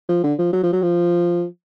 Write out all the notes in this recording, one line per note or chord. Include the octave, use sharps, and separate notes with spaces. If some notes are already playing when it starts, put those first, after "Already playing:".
F3
D3
F3
F#3
F3
F#3
F3